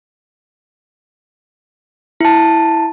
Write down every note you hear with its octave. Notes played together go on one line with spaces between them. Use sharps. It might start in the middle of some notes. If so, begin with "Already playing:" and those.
E4 A5